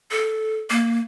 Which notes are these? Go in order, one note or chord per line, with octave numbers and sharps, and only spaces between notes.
A4
A#3